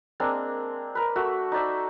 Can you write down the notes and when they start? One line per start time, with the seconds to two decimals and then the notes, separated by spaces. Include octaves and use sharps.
0.20 G#3 A#3 C4 D4
0.95 A#4 B4
1.16 A3 F#4 E5
1.52 D#4 C5 D5 E5